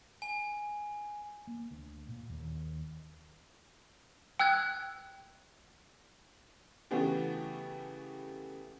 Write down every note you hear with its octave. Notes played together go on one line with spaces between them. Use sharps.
G#5
A#3
D2
A#2
D#2
G5 E6 F#6 G#6
C#3 E3 A3 B3 F#4 G4